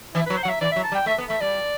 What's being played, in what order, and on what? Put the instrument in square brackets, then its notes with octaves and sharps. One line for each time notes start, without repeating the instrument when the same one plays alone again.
[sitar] E3 [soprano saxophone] E4
[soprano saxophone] B4
[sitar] F#3
[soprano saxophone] C5
[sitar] F#3 [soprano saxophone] F#5
[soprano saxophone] E5
[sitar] E3 [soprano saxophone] D5
[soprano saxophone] E5
[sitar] F#3
[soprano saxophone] A5
[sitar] G3
[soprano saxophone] G5
[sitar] A3 [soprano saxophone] E5
[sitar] B3
[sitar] A3 [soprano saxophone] E5
[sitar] G3 [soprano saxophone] D5